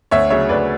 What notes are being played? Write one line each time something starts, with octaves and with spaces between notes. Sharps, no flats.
D2 C#5 E5
C#3 F#3 C#5 E5
D2 B4 D5